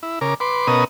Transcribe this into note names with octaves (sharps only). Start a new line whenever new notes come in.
E4
C#3 A#4 D6
B4 C6 D6
B2 B3 C#4 A#4 D#5 D#6